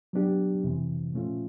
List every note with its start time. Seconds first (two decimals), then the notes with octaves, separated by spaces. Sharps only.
0.13 F#3 B3 D4 G4
0.64 F2 C3 E3
1.13 A#2 F3 A3 C#4 F4